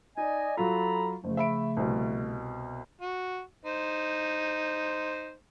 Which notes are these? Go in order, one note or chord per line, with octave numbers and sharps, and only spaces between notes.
D#4 D5 D#5 G#5
F#3 F4 A4 A#5 B5
F#1 C#3 F3 A3
E5 B5 D7
C2 B2
F#4
D#4 C5